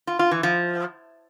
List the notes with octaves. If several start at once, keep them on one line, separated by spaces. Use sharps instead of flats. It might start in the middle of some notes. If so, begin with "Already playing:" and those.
F4
F4
E3
F3